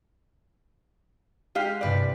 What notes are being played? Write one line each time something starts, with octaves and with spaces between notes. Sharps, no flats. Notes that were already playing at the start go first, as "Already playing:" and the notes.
G#3 G4 F5
C2 G2 B4 D5 G5